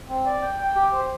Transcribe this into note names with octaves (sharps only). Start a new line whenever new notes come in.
C4
D5
G5
G5
G4
C5